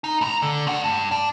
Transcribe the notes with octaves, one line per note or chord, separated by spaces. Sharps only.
D#4
A2 A#5
D3
A3 F#5
G2
D4